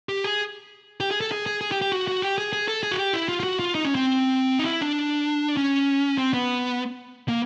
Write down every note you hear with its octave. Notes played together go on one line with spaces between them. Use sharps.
G4
G#4
G4
G#4
A4
G#4
G#4
G#4
G4
G4
F#4
F#4
G4
G#4
G#4
A4
G#4
F#4
G4
E4
F4
F4
F#4
F4
D#4
C#4
C4
D#4
E4
D4
C#4
C4
B3
A#3